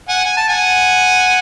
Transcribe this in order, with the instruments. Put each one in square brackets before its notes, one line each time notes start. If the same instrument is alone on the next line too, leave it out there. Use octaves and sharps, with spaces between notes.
[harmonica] F#5 G#5
G#5
A5
F#5 G#5